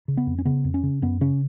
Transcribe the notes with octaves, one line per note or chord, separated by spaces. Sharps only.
C#3
B3
F2
C#4
C#3 B3
F2
C#4
C#3
F#2 B3
C#3 C#4